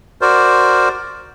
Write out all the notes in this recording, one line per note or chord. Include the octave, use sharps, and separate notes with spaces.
F#4 A#4 C5 D5